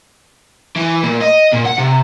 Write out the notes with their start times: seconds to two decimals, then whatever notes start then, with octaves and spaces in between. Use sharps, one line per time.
0.76 E3
1.03 A#2
1.21 D#5
1.53 A#2
1.66 F#5
1.78 C3